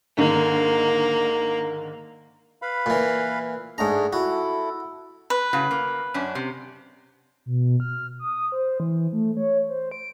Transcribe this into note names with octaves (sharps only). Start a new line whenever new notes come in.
G#2 D3 D#3 A#3
B4 F5 B5
A#2 E3
G#2 A3 D4 G#4 A#5
E4 F#4 A4
B4
A2 C#3 F#4
A#3
F#2 C#4 D4
C3
B2
F6
D#6
C5
E3
A3
C#5
C5
D7